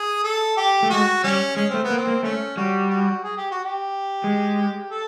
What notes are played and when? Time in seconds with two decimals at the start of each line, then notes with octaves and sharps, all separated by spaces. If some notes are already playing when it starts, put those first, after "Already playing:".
Already playing: G#4
0.24 A4
0.57 G4
0.83 A3
0.90 G#3 F#4
1.23 G3 C#4
1.56 G#3 C#4
1.70 A3 C4
1.84 B3
1.90 A#3
1.97 C4
2.07 A#3
2.23 A3 C#4
2.57 G3 F#4
2.90 F#4
3.23 G#4
3.37 G4
3.51 F#4
3.64 G4
4.24 G#3
4.90 A4